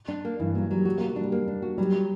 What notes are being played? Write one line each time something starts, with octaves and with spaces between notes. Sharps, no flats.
D4
A#3
G2 E3
F#3 A#3
F#3 G3
G3 F#4
A#3
F#4
A#3
G3 D4
A#3
D4
F#4
F#3 G3